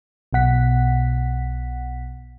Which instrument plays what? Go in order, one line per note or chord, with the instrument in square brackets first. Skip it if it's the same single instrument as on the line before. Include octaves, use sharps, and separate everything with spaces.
[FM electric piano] B1 B2 F#5 B6